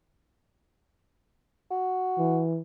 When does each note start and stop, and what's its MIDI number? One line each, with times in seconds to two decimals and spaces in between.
1.70 2.41 66
2.18 2.60 52